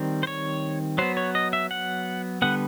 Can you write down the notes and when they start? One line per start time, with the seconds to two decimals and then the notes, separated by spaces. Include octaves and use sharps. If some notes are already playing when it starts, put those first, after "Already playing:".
Already playing: D#3 G3 C4
0.23 C5
0.27 C#5
0.98 F#3 B3 C5
1.17 C#5
1.35 D#5
1.53 E5
1.71 F#5
2.42 D3 G3 B3 F#5